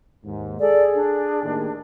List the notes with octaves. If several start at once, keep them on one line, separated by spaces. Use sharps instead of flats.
D#2 G#2
G#4 A4 D5
D4
D#2 A2 D#3